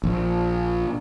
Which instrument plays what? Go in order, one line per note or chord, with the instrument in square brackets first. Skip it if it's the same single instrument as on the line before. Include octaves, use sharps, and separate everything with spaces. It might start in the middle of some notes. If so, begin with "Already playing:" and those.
[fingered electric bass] A#1